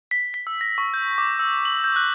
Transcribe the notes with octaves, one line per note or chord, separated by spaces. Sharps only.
B6
B6
E6
A#6
C#6
G6
D6
E6
F#7
G6
F#6